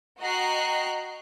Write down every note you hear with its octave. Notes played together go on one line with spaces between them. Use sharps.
F#4 D#5 G5 A#5 F#6 C7